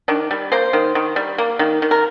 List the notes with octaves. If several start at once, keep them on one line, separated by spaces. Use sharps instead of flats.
D#3 D4
G3
A#3 C5
D#3
D#3
G3
A#3
D#3
D#3
A#4